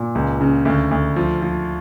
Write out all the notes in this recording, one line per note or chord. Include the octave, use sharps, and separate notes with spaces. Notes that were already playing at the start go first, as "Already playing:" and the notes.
Already playing: A#2
C#2
C#3
D2
D2
F3
F3